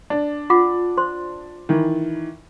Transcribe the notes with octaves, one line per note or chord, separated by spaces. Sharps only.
D4
F4 F#5 D6
C5 C6
D#3 E3